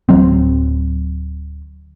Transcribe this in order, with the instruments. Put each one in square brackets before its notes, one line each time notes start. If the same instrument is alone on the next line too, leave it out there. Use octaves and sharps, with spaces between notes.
[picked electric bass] D1 F#3 C4